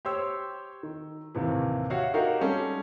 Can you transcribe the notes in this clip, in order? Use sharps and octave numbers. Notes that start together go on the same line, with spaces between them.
G4 C5 C#5 E6
D#3
D#2 A2 C3 E3
F#4 G4 C#5 E5 F5
D#4 F#4 G4 A#4 F5
G3 G#3 C#4 G#4 A4